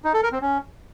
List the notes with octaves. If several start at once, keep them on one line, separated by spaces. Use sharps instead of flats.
D#4
A4
A#4
C4
C#4